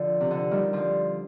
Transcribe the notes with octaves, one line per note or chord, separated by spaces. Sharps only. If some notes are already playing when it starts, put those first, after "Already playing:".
Already playing: D3 F3
C3
D3
D#3 G3
D3 F3